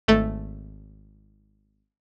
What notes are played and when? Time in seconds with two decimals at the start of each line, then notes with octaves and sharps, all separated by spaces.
0.08 G#1 A3 A4